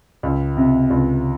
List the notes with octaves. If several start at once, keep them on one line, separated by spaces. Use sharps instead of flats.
C#2
C3
C#2